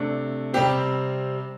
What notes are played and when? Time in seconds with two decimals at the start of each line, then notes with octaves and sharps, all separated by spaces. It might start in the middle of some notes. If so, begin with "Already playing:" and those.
Already playing: C3 A3 D4
0.53 C3 G3 C4 G4